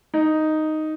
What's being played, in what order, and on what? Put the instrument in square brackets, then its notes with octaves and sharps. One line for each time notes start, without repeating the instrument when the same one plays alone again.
[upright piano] D#4